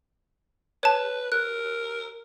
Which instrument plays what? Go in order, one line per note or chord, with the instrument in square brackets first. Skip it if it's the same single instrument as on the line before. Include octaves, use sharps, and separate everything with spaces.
[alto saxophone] B4 [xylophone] C#5 A5
[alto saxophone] A#4 [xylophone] F#6